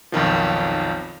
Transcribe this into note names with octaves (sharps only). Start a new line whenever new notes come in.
B1 F2 D#3 F3